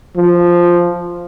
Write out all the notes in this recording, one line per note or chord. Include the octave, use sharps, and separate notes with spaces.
F3